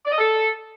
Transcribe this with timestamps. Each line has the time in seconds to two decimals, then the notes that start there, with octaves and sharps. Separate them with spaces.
0.06 D5
0.12 D#5
0.19 A4